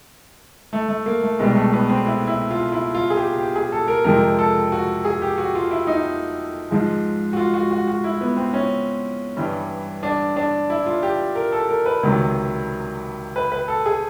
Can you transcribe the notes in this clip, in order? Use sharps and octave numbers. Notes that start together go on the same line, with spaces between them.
A3
A3
A#3
A3
C2 B2 G3 G#3
A3
B3
C4
E4
E4
F4
E4
F4
G#4
G4
G4
G#4
A4
A#4
F2 C3 F3 G#3 A#4
A4
F#4
G#4
G4
F#4
F4
E4
D#4
G#2 F3 G#3
F#4
F4
F#4
F#4
F#4
E4
B3
C4
C#4
G2 E3 G3
D4
D4
E4
F4
G4
A#4
A4
A#4
B4
C#2 C3 D#3 F#3
B4
B4
A4
G#4